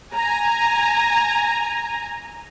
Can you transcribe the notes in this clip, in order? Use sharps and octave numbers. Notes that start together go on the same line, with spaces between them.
G#5 A#5